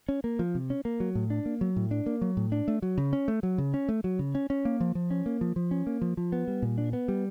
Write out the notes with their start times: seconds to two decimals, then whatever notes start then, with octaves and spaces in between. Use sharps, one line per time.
0.09 C#4
0.24 A#3
0.39 F3
0.55 C3
0.70 C#4
0.85 A#3
1.00 F#3
1.15 A2
1.30 D4
1.46 A#3
1.61 F#3
1.76 A2
1.91 D4
2.06 A#3
2.21 F#3
2.37 A2
2.52 D4
2.68 A3
2.82 F#3
2.98 C#3
3.13 C#4
3.28 A3
3.43 F#3
3.58 C#3
3.74 C#4
3.89 A3
4.04 F#3
4.19 C#3
4.35 C#4
4.50 C#4
4.65 A#3
4.80 F3
4.95 F3
5.11 C#4
5.26 A#3
5.41 F3
5.56 F3
5.71 C#4
5.87 A#3
6.02 F3
6.17 F3
6.32 B3
6.48 G3
6.62 A#2
6.78 D4
6.93 B3
7.08 G3